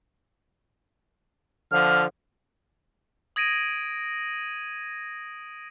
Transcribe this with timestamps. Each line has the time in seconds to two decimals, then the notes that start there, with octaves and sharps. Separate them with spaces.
1.71 D3 F3 F6
3.36 D#6 G#6 A#6 D7 D#7